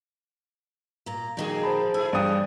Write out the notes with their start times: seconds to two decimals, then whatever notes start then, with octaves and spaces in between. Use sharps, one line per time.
1.06 A#2 A#5
1.37 A#2 D#3 F3 D#4 G#4
1.63 C5 A5 B5
1.94 A3 E4 G#4 G#5
2.13 G2 E3 D5 G5 D#6